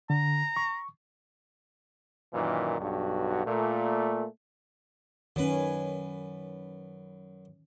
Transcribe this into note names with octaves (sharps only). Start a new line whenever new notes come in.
D3 A#5
C#6
F#2 A#2 D#3 E3
B1 G2 F#4
A#2 A3
F#2 D#3 C#4 B4